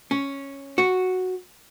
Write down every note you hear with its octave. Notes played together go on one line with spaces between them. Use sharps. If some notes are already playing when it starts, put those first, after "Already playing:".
C#4
F#4